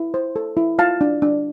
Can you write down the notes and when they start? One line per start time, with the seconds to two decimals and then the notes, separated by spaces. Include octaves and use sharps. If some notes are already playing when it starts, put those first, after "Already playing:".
Already playing: E4
0.14 C5
0.36 A4
0.57 E4
0.78 F4 F5 A5
1.01 D4
1.22 D4